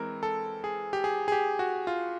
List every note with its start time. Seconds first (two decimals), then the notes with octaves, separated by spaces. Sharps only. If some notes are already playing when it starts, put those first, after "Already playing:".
Already playing: E3 G#3 C4 A#4
0.23 A4
0.64 G#4
0.93 G4
1.04 G#4
1.28 G#4
1.32 G4
1.59 F#4
1.87 F4